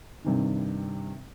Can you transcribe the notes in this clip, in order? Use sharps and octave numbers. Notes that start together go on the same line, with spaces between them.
G2 C3 D#3